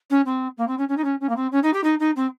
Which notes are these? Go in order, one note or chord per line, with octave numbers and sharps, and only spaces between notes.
C#4
C4
A#3
C4
C#4
C#4
D#4
C#4
C#4
A#3
C4
C#4
D#4
G4
D#4
D#4
C4